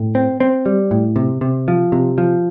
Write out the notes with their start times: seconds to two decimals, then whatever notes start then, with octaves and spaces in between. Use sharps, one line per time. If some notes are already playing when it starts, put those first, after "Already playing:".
Already playing: A2
0.15 C4
0.40 C4
0.66 G3
0.91 A2
1.16 C3
1.41 C3
1.68 F3
1.92 C3
2.18 F3